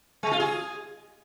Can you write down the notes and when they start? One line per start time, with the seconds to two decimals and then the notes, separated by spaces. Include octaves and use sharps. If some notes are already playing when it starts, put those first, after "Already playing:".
0.23 G#3
0.31 F4
0.40 G#4